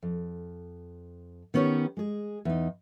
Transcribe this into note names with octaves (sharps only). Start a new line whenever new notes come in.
F2
D#3 B3 C#4 G4 C#5
G#3 G#4
E2 D#4